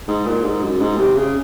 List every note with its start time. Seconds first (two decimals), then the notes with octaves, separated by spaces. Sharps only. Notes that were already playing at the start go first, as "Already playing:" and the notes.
0.08 G#2
0.27 A#2
0.45 G#2
0.62 F#2
0.80 G#2
0.98 C3
1.16 C#3